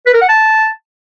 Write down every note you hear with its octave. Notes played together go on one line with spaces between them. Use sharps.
B4
A#4
F#5
A5